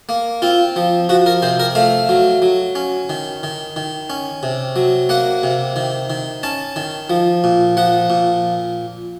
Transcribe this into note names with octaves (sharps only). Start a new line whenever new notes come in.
A#3
C4 F4
F3
F3 F#4
A#4
C3 C5
A#4
A3 F5
F#3
F#3
C#4
D#3
D#3
D#3
C#4
C3
F#3
A#3 F#5
C3
D#3
D#3
C#4 A5
D#3
F3
A#2
F3 F#5
A#2